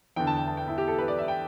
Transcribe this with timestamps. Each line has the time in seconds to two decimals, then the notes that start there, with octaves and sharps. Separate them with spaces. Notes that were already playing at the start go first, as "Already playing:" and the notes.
0.16 E2 D3 G5
0.27 A5
0.37 G5
0.47 A5
0.57 G5
0.68 E4
0.78 G4
0.88 A4
0.98 B4
1.08 D5
1.18 E5
1.28 G5